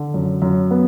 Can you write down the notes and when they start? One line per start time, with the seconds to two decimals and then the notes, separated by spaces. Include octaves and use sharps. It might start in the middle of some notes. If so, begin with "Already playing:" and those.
Already playing: D3
0.14 F#2
0.42 F#2
0.71 B3